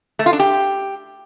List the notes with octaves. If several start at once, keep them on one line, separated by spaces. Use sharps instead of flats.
A3
F4
D4
G4